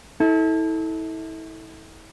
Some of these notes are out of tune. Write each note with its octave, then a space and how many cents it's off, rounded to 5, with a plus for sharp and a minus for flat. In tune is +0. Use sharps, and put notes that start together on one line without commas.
E4 -35 A4 +0